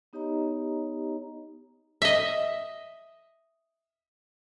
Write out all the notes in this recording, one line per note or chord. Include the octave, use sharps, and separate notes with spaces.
B3 D#4 G4 C#5 D#5 A#5
D#5 E5